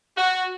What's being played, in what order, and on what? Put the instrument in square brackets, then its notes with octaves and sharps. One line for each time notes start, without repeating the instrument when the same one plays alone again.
[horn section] F#4